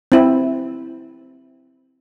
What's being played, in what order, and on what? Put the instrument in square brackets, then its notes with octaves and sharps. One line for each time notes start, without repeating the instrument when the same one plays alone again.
[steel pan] C4 E4